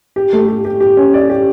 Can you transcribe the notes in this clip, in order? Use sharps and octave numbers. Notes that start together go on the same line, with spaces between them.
G4
A3
G4
G4
G4
C#4
D5
G4